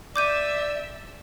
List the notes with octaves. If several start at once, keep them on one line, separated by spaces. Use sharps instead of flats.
D5 E5 D6 G6 D#7